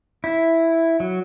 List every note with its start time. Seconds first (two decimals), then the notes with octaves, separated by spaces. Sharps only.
0.24 E4
1.00 F#3